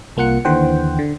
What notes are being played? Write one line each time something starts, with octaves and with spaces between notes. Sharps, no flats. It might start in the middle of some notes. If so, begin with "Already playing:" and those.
C2 A#3 F4 F#5 C#7
D#2 D3 E3 C5 F#5 G5
D3